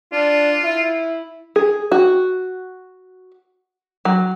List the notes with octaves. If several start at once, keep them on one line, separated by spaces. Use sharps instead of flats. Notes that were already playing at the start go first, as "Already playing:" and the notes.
D4 F4
E4
G#4
F#4
F#3